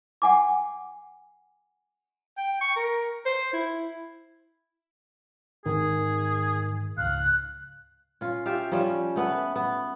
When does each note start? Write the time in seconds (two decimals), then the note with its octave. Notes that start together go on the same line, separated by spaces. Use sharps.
0.22 F#5 G#5 D6
2.37 G5
2.61 C#6
2.76 A#4
3.26 C5
3.53 E4
5.66 G#2 D#3 C4 G#4
6.97 C#2 G#2 F5 F#6
8.21 C#4 F4
8.46 F4 G4 E5 F5
8.72 F3 G3 C#4
9.16 A3 B3 B4
9.56 B3